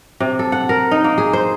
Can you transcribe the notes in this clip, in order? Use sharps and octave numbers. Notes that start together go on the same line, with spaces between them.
C3
A4
F#5
A#4
D#4
A#3
G#4
C5